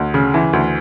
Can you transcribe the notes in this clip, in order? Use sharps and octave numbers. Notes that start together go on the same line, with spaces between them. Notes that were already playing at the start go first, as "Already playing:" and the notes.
Already playing: D2
C#3
E3
D2